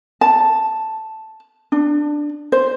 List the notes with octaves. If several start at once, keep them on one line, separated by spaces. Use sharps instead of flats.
A5
D4
C5